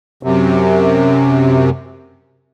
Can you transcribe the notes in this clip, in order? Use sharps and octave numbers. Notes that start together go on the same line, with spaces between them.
F#2 C3